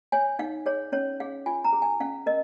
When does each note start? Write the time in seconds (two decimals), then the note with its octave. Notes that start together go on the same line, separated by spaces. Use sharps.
0.12 C#5 G#5
0.39 D#4 F5
0.66 G#4 C#5
0.92 C#4 C#5
1.20 G#4 F5
1.46 F4 G#5
1.64 A#5
1.73 G#4
1.82 G#5
2.00 C#4 F5
2.26 A#4 D#5